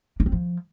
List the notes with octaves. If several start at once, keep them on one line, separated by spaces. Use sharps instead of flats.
D4
C4
F3